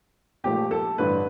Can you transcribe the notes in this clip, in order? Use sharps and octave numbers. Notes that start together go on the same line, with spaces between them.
A#1 G#2 F3 A3 G4
A4
A1 G2 D3 B4